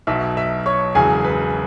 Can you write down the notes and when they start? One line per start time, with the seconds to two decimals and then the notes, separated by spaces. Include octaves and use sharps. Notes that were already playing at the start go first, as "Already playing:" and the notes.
0.07 B1 B2 F#3 E5 E6
0.37 E5 E6
0.66 C#5 C#6
0.94 E1 E2 C#3 F#3 G#4 G#5
1.24 B4